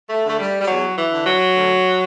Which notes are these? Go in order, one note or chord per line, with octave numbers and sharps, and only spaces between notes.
A3
D3
A3
G3
G3
E2 F#3
E3
D3
F#3
D2